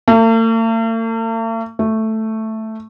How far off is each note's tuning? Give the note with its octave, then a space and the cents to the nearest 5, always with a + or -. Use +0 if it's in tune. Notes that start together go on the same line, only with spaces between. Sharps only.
A3 +45
A3 +0